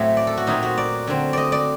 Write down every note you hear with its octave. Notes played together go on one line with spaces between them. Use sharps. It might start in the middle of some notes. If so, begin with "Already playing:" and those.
Already playing: A2 F#3 A3 C4
D5
A4
F#4
A#2 F#3 C4 D#4
F#4
D5
D3 F#3 C4
D5 D#5
D5